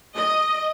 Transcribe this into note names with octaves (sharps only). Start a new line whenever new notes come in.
D#5